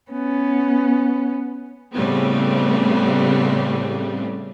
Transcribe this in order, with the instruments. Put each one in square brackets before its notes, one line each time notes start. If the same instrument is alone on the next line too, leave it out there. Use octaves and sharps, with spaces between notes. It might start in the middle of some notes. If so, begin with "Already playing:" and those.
[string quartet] B3 C#4
[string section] A2 C#3 G3 A3 B3 C4